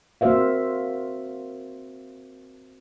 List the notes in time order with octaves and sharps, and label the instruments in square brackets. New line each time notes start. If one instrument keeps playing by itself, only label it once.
[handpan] A#3 C4 F#4 C5 E5 F5